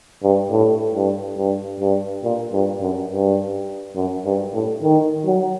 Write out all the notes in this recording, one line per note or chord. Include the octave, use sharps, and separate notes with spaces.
G2
A2
G2
G2
G2
A#2
G2
F#2
G2
F#2
G2
A2
D#3
F#3